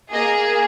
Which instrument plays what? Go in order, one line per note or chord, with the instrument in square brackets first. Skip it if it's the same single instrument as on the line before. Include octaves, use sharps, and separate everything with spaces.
[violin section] A#3 G#4 D#5